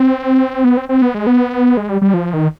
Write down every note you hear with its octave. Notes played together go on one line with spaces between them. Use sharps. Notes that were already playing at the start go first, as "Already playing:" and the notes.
Already playing: C4
B3
C4
C4
B3
G#3
B3
G#3
G3
G3
F3
D#3